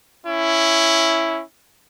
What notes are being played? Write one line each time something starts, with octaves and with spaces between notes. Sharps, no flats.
C#4 E4